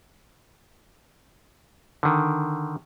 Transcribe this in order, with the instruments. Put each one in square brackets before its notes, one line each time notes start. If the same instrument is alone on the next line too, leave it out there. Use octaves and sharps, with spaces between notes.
[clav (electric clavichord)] D3 D#3